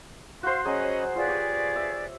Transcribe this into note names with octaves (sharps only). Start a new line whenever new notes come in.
F#4 C5 F5 C6
F#3 C#4 G#4 D#5 B5
F4 G#4 B4 D5
G4 C#5
E5